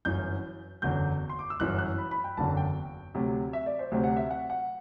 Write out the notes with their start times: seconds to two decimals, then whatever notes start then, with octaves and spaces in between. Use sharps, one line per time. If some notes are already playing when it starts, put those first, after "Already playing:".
0.05 G1 F#2 E3 G6
0.82 F#1 E2 D3 F#3 G6
1.30 C6
1.39 D6
1.50 E6
1.60 G1 F#2 E3 F#6
1.79 F#6
1.98 B5
2.11 B5
2.24 G5
2.37 F#1 E2 D3 F#3 A5
2.57 G5
3.15 D2 C3 F#3
3.53 E5
3.66 D5
3.79 C5
3.91 D2 C3 F#3 C5
4.04 F#5
4.17 E5
4.31 F#5
4.50 F#5